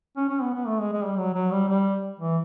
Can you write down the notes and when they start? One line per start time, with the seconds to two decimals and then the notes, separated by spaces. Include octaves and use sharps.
0.17 C#4
0.29 C#4
0.42 B3
0.54 B3
0.67 A3
0.80 G#3
0.92 G#3
1.05 G3
1.18 F#3
1.34 F#3
1.51 G3
1.68 G3
2.19 E3